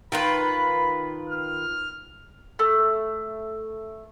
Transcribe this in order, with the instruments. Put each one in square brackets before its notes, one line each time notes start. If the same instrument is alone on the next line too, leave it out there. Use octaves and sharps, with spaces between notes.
[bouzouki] D#3 F4 B4 [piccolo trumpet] B5
[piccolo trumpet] F6
[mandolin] A3